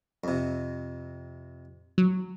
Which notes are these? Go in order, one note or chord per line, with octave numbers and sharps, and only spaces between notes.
F2 C3
F#3